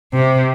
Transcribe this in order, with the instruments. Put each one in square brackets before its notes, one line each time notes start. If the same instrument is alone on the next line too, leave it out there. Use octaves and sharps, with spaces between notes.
[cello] C3